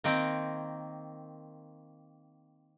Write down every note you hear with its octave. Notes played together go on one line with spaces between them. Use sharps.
D#3 A#3 C4 G5